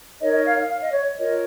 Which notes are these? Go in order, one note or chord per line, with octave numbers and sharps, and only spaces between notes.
D#4 A#4 C#5 D#5
D#5
F5
F5
D#5
C#5
F4 A#4 C#5 D#5